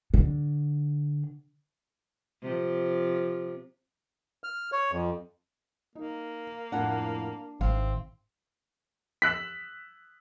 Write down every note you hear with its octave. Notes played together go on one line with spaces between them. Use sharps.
D3
C3 F3
F6
C#5
F2
A#3 D#4
F2 A2 D4 F#5
G#1 C4 E5 F5
E6 F#6 B6